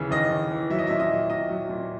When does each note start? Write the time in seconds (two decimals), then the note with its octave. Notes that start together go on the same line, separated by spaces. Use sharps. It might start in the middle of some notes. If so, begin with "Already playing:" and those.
Already playing: D#2 C#3 E3
0.11 D#2 D#5
0.31 D#2
0.51 E3
0.70 F#3 E5
0.79 D#5
0.87 A#2 E5
0.99 D#5
1.10 F#3
1.30 A#2 D#5
1.50 F#3
1.69 A#2